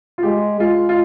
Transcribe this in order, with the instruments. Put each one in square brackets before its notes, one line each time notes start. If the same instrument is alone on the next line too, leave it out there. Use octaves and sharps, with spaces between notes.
[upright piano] F4
[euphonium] G#3 [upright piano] G4
[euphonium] G#3 [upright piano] F4
[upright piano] F4